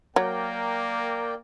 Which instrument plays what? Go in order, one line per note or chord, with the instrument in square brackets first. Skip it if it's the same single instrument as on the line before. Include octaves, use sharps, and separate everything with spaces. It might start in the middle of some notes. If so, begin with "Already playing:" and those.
[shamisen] F#3 [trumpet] A#3 [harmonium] A#4 D5 G5